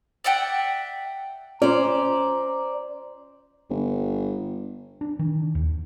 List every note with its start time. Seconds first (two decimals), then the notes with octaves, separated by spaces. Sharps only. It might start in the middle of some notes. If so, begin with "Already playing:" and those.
0.24 D5 E5 F#5 G5
1.62 C#4 F4 C5 D5 A#5
3.70 G1
5.01 D4
5.19 D#3
5.55 D#2